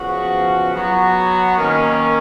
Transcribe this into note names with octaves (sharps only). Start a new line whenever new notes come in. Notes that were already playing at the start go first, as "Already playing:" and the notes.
Already playing: C#3 F3 B3 F#4
F#3 B3 F#4
D#3 A#3 C#4